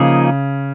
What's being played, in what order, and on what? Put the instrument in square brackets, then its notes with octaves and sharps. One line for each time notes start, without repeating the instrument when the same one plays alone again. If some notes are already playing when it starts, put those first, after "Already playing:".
Already playing: [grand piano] C#3 [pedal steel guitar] F3 A#3 D#4 G#4